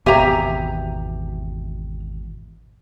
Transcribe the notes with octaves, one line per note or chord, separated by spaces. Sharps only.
G#1 E2 B2 G4 E5 G#5 A#5